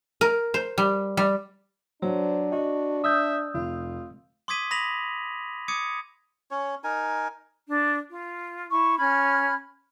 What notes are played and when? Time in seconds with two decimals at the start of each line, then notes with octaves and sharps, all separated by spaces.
0.21 A#4
0.54 C5
0.78 G3
1.17 G3
2.02 F#3 D4 C5
2.52 F#4 D#5
3.04 E5 D#6 E6 G6
3.54 F1 F4
4.48 C6 D6 D#6 G#6 B6 D#7
4.71 B5 D#6 A#6 B6 F7 F#7
5.68 D6 D#6 G#6 C#7 D#7
6.51 C#4 C#5
6.84 D#4 A#4 G#5
7.66 D4
8.10 F4
8.71 E4 C#6
8.98 C#4 B5 F6 G#6